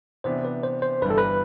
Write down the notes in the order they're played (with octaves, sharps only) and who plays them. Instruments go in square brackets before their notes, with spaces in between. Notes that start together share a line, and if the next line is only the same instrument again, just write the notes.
[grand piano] C3 E3 B3 D4 [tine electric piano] C5
[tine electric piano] B4
C5
C5
[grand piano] G1 G2 E3 G3 [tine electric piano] B4
[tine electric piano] A4
B4